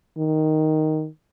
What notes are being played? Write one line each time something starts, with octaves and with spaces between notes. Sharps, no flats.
D#3